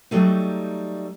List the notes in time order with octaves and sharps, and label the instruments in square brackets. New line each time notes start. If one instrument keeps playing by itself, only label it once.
[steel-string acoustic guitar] F#3 G3 A3 D#4